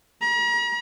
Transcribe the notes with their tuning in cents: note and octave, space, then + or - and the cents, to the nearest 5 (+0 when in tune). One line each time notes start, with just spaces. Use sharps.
A#5 +45